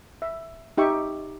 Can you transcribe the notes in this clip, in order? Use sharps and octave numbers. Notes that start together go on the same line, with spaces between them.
E5
D#4 G4 E5 C#6